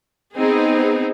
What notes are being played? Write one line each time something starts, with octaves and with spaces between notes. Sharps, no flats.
B3 C4 D#4 G#4